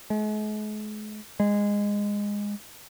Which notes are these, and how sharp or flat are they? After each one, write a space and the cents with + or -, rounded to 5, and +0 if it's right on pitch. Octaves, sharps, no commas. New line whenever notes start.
G#3 +45
G#3 -15